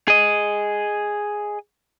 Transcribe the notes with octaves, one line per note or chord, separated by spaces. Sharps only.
G#4 D#5